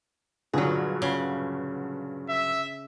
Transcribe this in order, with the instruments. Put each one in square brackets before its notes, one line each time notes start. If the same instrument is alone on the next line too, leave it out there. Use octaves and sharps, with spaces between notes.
[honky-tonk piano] G2 A#2 D3 [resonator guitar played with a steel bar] F#3 G#4
[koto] C#3
[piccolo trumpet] E5